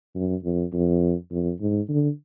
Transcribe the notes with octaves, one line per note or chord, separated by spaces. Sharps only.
F#2
F2
F2
F2
G#2
D3